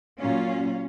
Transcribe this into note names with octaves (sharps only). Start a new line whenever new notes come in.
A#2 F#3 C#4 F4